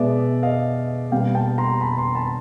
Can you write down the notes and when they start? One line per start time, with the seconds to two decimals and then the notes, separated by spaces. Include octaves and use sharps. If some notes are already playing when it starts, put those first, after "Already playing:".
Already playing: B2 G#3 B3 D5 E5
0.43 D#5 F5
1.12 B2 G3 A#3 F5 G5
1.35 G5 A5
1.58 A#5 C6
1.81 A5 B5
1.98 A#5 C6
2.15 A5 B5